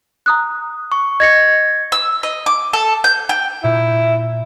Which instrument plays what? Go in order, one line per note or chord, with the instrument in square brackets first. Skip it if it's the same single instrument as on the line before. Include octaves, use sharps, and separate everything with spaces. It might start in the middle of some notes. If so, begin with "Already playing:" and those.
[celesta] A#5 D#6 F#6
[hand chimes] C#6
[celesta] D#5 A#6 C#7 [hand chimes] G#6
[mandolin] E6
D#5
D6
A4
G6
G5
[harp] A#2 [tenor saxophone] E4